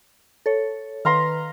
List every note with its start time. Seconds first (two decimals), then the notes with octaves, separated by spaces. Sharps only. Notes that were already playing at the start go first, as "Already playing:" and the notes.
0.46 A4 C#5
1.05 D#3 B4 F5 A#5 C6